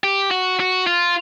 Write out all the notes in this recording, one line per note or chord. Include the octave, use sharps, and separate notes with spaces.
G4
F#4
F#4
F4